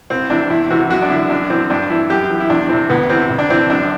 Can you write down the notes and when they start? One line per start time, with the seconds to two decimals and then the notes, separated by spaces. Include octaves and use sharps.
0.10 C2 C4
0.30 C3 E3 D4
0.50 E2 E4
0.70 C3 E3 F#4
0.90 F#2 F#4
1.02 D4
1.10 D3 E4
1.30 F#2 D4
1.50 E3 C4
1.70 G2 D4
1.90 E3 E4
2.10 F#2 G4
2.30 E3
2.40 E4
2.50 E2 D4
2.69 C3 E3 C4
2.89 D2 B3
3.09 C3 E3 C4
3.30 D2
3.38 D4
3.50 C3 E3 C4
3.70 F#2 D4